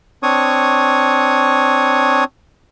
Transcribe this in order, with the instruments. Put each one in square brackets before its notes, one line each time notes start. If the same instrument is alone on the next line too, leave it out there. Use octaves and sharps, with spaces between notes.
[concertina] C4 D4 C#5 C#6 D#6